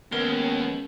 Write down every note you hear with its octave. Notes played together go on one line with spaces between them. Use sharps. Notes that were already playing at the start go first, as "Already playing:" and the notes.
D#2 G#3 B3 C#4 A#4